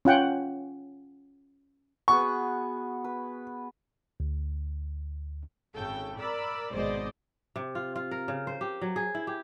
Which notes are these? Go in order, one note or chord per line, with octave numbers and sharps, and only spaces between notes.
C#4 F4 F#5 G5
B3 F#4 G#4 C#6
B4
D2
G#1 C#3 A4 G5
A#4 D5 B5 E6
G#1 B2 G#3 C5 D5 D#5
C3
F4
F4
A#4
C#3
C5
G4
F#3
G#4
E4
G4